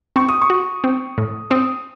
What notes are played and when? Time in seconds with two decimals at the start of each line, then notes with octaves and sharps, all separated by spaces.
0.16 C4 C#6
0.29 D#6
0.42 C#6
0.50 F#4
0.84 C4
1.18 A2
1.50 C4 D#6